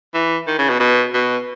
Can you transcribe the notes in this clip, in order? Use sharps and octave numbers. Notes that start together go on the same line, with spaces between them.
E3
D#3
C#3
B2
B2
B2